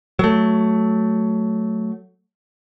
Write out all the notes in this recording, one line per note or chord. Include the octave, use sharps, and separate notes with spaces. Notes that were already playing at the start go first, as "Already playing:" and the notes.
F#3 A3